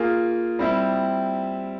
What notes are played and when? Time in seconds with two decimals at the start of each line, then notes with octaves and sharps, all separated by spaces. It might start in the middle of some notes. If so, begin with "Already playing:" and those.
Already playing: A#3 F4 G#4
0.59 G3 C4 E4